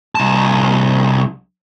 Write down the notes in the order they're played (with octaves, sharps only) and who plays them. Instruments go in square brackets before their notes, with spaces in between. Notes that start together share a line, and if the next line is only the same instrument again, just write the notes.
[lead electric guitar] C2 A5